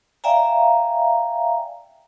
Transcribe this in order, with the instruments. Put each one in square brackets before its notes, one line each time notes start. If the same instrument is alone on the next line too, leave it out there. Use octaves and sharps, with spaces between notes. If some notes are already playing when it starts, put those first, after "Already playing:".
[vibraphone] D5 E5 F5 G5 G#5 A#5